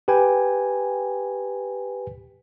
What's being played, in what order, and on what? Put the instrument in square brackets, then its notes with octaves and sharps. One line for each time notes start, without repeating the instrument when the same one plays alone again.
[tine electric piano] G4 B4 G5 G#5